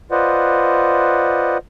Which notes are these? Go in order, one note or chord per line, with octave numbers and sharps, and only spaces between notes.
F4 B4 C5 D5 D#5 F#5